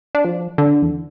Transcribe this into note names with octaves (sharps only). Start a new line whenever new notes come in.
D4
F3
D3
E2